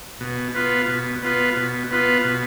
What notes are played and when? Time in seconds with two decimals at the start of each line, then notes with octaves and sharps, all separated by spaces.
0.21 B2
0.55 B3 F4 B4
0.88 B2
1.23 B3 F4 B4
1.56 B2
1.91 B3 F4 B4
2.25 B2